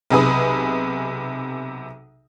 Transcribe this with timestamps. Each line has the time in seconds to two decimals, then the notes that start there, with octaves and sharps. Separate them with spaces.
0.10 B1 C3 G#4 B4 D#6